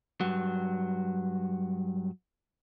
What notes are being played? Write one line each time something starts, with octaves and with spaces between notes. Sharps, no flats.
G2 F#3